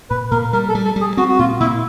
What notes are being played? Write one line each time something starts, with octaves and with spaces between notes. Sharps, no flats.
A#2 B4
A#2 A#4
G3 A#4
A4
G3
A4
G3
G#4
C4 F#4
F#4
A#2 F4
A#2 E4